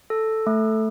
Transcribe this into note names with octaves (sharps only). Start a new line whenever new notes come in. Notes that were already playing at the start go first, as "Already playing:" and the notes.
A4
A3